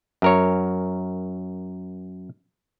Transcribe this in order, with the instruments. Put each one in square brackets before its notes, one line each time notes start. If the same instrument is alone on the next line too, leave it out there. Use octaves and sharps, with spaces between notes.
[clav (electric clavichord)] F#2 A#4 C#5